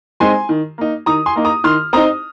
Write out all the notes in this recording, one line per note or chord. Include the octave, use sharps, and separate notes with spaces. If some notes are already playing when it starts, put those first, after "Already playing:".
G#3 C4 D#4 G#5 C6
D#3
A#3 D#4
D#3 A#5 D#6
G#5 C6
A#3 D#4
A#5 D#6
D#3 C6 F6
C4 D#4 A#5 D#6